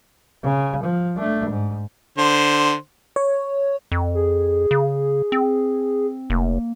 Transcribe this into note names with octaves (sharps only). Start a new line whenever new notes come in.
C#3
F3
A3 D4
G#2
D3 C5
C#5
F2
G#4
C#3
C4
F1 A#3